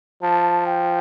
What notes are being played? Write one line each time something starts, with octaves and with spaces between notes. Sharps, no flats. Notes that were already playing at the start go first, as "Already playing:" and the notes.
F3 A5
G5